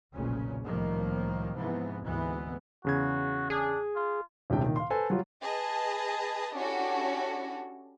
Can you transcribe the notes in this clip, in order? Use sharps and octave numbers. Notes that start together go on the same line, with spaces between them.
F1 B1 A#2 C#3 C#4
C2 A2 D#3 F3 A#3
G#2 C3 E3 F3 B3
D2 G#2 C3 E3 B3
E2 C#3 F#4 G#6
D4 G#4
F4
D#1 C2 C3 G#3 D4 G5
A#2 D#3
F5 C6
A4 B4 C5 G#5
F#3 G3 F4
G#4 B4 D#5 A5
C#4 D4 E4 F#4 G4 A4